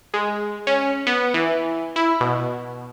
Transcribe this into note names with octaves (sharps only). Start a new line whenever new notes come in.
G#3
C#4
B3
E3
E4
B2